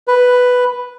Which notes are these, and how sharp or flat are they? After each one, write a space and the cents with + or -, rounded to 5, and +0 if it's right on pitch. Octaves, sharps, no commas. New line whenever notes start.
B4 +5